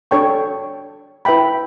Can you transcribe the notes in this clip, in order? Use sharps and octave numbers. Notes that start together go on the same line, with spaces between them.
D4 A4 C#5 G5 C#6
E4 B4 E5 G5 B5